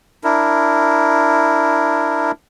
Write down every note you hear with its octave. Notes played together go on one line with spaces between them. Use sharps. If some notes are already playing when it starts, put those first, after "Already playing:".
D4 E4 A#4